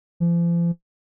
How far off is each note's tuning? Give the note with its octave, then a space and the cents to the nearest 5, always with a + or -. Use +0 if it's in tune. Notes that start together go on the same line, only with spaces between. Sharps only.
F3 -40